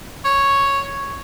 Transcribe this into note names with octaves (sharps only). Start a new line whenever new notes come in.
C#5